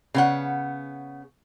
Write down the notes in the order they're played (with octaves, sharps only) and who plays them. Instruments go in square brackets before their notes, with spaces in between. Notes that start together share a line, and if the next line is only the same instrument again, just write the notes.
[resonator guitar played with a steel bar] C#3 B3 F#5